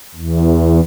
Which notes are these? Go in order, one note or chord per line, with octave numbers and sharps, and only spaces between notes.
E2